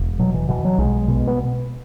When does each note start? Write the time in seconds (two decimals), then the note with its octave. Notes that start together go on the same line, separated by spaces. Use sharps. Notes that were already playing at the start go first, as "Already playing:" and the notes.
Already playing: E1
0.19 B2 F#3
0.34 E3
0.49 B2 E3
0.65 F#3
0.78 B1 G#3
1.08 B2
1.27 B3